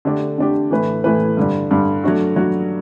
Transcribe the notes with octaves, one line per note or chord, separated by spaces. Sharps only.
D3 A3 D4 G4
D3 A3 D4 G4
A2 E3 A3 E4 B4
A2 E3 A3 E4 B4
G2 D3 G3
G2 D3 G3
F#3 A3 D4 F#4
F#3 A3 D4 F#4